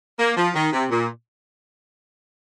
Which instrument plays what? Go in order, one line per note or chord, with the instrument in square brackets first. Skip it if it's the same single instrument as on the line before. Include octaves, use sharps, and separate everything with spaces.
[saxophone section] A#3
F3
D#3
C3
A#2